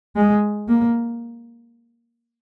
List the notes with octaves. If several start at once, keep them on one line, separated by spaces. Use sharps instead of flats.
G#3
A#3